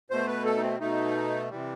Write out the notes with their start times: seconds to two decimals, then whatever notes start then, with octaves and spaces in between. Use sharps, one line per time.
0.10 B2 A3 C5
0.27 B4
0.45 A4
0.57 D#4
0.62 C4
0.80 B2 A3 D#4
1.50 C3 E3 G3